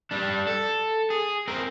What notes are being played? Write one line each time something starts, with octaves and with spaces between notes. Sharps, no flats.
G3 D4
A4
G#4
C4 A#4